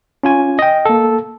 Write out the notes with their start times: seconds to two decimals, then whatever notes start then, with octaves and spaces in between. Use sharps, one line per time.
0.23 C#4 F4 G#5
0.59 D#5 G5
0.85 A#3 A4